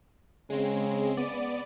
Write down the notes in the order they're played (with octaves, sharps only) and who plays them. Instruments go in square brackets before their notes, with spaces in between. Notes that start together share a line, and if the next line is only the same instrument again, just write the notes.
[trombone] C#3 [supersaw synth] G#3 C4
[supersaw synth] B3 D5 D#7